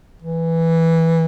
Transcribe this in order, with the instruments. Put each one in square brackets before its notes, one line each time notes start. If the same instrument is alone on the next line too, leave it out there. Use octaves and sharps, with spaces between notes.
[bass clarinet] E3